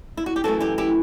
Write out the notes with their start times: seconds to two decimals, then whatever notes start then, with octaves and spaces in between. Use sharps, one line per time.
0.17 E4
0.26 F#4
0.36 G4
0.44 F#2 E3 A3 F#4 A4
0.61 E4 G4
0.78 E4 G4